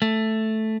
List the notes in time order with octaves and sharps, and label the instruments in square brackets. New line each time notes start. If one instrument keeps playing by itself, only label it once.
[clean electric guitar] A3